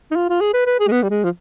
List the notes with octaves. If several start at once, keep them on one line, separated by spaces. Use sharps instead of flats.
D#4
F4
F4
G#4
B4
B4
G#4
G#3
B3
G3
G#3
F3